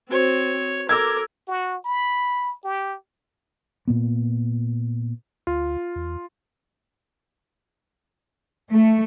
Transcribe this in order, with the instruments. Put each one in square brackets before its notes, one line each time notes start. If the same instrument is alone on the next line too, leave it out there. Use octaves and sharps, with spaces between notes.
[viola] C4 [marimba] F#4 C5 [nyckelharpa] C#5
[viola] A4 [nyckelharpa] A#4 [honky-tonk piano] D6 E6 G#6
[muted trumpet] F#4
B5
G4
[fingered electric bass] A#2 A#3 B3
[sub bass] D2 [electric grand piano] F4
[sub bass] E2
[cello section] A3